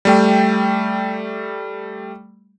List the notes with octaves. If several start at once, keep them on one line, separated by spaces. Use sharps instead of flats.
G3 A3 G5